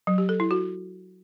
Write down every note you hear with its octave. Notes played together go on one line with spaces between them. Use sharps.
F#3
G4
A4
E4
F#4